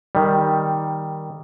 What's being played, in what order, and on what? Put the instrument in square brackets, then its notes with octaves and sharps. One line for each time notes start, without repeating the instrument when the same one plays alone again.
[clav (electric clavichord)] D#3 G3